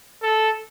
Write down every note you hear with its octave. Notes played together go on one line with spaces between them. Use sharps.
A4